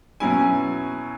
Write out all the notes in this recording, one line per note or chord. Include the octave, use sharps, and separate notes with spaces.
B2 F#3 C#4 E4 G#5